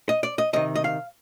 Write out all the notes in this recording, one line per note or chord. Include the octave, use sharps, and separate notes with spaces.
D#5
D5
D#5
C3 D#3 D#5
D#5
F5